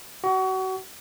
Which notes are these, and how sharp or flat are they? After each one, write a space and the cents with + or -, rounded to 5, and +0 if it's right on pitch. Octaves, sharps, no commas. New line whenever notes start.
F#4 +30